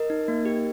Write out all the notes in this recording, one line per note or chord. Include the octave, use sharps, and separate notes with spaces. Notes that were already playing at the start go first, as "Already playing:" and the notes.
Already playing: A#4 D#5
D#4
A#3
G4